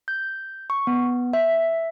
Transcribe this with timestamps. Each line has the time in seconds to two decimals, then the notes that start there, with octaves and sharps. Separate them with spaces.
0.08 G6
0.70 C#6
0.87 B3
1.33 E5